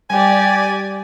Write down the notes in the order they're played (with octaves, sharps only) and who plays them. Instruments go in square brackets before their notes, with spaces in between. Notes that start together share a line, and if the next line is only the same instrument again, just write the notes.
[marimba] G3 [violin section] G4 D5 [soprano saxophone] G#5